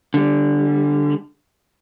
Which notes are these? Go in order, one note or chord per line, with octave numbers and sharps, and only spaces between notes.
D3 G3